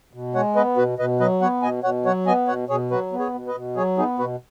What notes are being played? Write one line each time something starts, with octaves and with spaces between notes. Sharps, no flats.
B2
G#3 C#5 F#5
B3 B4 D#5
B2 F#4 B4
B2 B4 D#5
F#3 B4 D#5
B3 C#5 F#5
B2 D#5 G#5
B2 C#5 F#5
F#3 C#5 F#5
B3 D#5 G#5
B2 C#5 F#5
B2 G#4 C#5
F#3 F#4 B4
B3
G#4 C#5
B2
B4 D#5
B2
F#3 G#4 C#5
B3 D#4 G#4
B2 F#4 B4